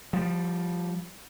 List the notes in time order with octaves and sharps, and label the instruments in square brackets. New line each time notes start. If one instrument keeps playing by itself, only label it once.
[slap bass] F3 G3